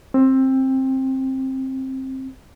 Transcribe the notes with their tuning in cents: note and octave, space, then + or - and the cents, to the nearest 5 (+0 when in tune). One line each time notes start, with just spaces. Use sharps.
C4 +15